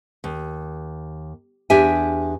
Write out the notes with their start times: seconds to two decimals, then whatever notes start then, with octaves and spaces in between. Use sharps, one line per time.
0.24 D#2
1.70 E2 D4 G4 E5 G#5